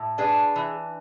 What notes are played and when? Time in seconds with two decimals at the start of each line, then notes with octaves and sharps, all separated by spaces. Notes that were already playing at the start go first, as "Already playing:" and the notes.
Already playing: A2
0.18 D4 G#4 B4
0.56 E3